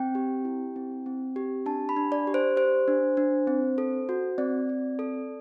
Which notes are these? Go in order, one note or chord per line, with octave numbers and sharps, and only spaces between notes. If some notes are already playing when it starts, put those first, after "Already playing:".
Already playing: C4 G5
G4
E4
C4
C4
G4
D4 A5
B5
D4
D5
G4
C5
G4 C5
D4
D4
C4
A4
F#4
C4 D5
C4
A4